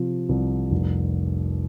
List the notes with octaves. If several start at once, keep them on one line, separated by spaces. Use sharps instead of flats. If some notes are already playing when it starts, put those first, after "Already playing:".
Already playing: C3 F3
C2
F1